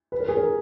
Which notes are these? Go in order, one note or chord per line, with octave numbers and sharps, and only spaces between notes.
B4
A#4
G#4
A#4